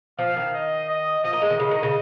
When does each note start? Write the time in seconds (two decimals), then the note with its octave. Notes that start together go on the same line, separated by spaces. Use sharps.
0.18 F3 F5
0.36 D#3
0.54 D#5
0.89 D#5
1.24 F3 D#5
1.33 A#3
1.42 G#3
1.50 D#3
1.59 C#3 D#5
1.71 D#3
1.83 C#3